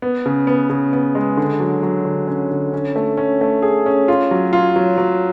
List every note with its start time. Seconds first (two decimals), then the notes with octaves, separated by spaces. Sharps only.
0.02 B3
0.26 C#3
0.47 B3
0.70 C#3
0.93 B3
1.15 G#3
1.37 D3
1.60 F#3
1.83 F#3
2.05 D3
2.27 C#4
2.51 D3
2.73 C#4
2.96 A3
3.17 C#4
3.41 A3
3.62 G#4
3.86 C#4
4.08 F4
4.31 F#3
4.53 F4
4.76 F#3
4.98 F#3